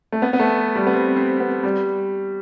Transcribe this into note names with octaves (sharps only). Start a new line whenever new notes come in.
A3
B3
B3
A3
G3
B3
C4
C4
B3
G3